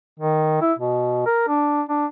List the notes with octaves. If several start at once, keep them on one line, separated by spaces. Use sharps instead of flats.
D#3
E4
B2
A#4
D4
D4